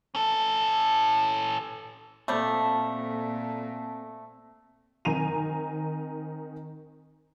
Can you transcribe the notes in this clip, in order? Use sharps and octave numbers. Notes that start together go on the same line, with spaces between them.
C#4 A4
A#2 G3 A3 C4 A4
D#3 C4 G#5 A#5 D#7 F7